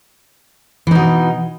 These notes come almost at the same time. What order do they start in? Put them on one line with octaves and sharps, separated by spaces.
E3 D#4 B2